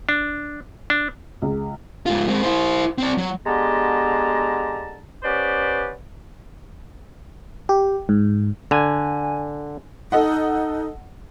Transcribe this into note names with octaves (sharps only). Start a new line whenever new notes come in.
D4
D4
C#2
G#2 F4
G#3 C4
E4 C5
C4 D5
F#3
D3 G#3 B3 G4 A5 A#5
B3 C#4 G4 B4 C5 D5
G4
G#2
D3 G#5
D#4 A4 D#5 F#5